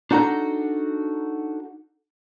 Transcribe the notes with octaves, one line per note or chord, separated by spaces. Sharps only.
D4 D#4 F#4 A4 A#5